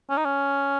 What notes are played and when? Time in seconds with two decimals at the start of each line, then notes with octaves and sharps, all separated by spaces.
0.10 C#4
0.18 D#4
0.25 C#4